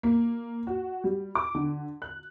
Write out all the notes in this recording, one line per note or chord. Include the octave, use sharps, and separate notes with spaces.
A#3
F#4
G3
D6
D3
F#6